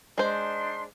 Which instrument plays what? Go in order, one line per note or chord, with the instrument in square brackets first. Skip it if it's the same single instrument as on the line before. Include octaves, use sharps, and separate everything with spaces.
[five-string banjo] G#3 C5 [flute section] D4 D#4 C6